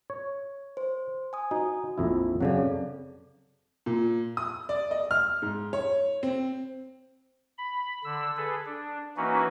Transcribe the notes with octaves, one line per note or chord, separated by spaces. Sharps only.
C#5
C5
G#5 D#6
D#4 F#4
A#1 F2 E4
F#2 C#3 F#3 C4 A4 D5
A#2
D#6
D5
D#5
F6
G#2
C#5
C4
B5
D3 E6
G#4 A4 B4
D4
E3 A#3 C#4 D#4 F#4 B4